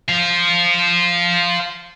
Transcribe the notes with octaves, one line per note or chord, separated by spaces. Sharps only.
C5 F5